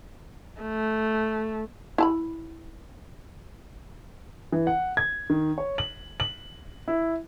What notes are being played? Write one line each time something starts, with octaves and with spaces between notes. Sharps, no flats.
A3
E4 A5 B5
E3
F#5
G#6
D#3
C#5
F#7
F#7
E4